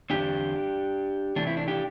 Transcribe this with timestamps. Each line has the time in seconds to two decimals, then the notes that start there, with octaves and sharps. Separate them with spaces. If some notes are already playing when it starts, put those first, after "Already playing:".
0.10 E2 D3 C4 D4 G4
1.36 C3 E3 A3 C4 D4
1.47 C4 E4
1.57 D4
1.68 D4 G4